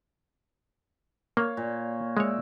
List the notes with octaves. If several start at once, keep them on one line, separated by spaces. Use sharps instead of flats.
A#3 C#5 F5
A#2
G#3 C#5 D5 E5